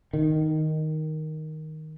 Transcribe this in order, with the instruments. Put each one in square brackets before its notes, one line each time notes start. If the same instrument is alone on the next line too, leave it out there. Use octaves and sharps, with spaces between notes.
[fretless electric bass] D#3